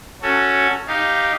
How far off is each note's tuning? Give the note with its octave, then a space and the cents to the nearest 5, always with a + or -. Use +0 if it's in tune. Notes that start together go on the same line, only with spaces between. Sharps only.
C#4 +0 F#4 +0 A4 +15
D#4 +0 G4 +0 F5 +0